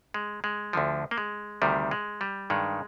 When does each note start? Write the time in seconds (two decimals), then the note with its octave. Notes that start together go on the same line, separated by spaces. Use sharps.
0.14 G#3
0.44 G#3
0.73 D2 D3 F3
1.11 A#3
1.18 G#3
1.62 D2 C3 D#3 G3
1.91 G#3
2.21 G3
2.50 G2 D#3 G#3